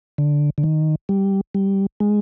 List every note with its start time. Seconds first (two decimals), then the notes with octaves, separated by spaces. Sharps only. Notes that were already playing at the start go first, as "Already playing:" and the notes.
0.18 D3
0.58 D3
0.63 D#3
1.09 G3
1.54 G3
2.00 G#3